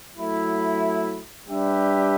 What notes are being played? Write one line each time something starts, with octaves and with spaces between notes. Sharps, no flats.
F#3 A3 E4
G3 D4 G4 B4 E5